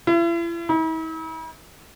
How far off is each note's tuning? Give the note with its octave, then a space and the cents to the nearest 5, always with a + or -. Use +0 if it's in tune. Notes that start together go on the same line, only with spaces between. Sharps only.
E4 +40
E4 -45